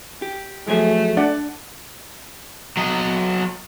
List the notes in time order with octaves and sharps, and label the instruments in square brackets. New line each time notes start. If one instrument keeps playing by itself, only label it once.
[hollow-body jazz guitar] G4
[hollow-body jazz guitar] F3 F#3 G#4 [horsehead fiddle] A3
[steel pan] D4 D5 F#5
[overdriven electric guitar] F#3 D#5